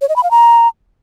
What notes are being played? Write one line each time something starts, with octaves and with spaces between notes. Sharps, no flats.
C#5
D#5
B5
F5
A#5